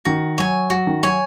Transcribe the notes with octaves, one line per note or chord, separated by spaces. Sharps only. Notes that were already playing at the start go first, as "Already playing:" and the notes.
D#3 F#4
F#3 C#5 G#5
F#3 F#4
D#3
F#3 C#5 G#5